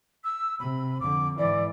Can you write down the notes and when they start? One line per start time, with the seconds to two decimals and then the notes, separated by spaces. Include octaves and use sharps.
0.24 E6
0.59 C3 B5
1.00 F2 D3 D6
1.38 G#2 E3 D5